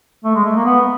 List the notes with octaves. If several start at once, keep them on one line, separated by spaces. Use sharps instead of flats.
A3
G#3
A3
A#3
B3